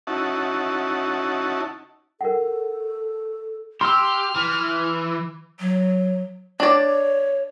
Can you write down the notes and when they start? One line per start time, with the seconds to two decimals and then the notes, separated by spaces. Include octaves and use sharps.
0.07 C#4 D#4 E4 F#4 A5
2.21 A4 A#4 F#5
3.81 G4 C6 E6 F6
4.36 E3
5.59 F#3
6.60 D4 C#5 D5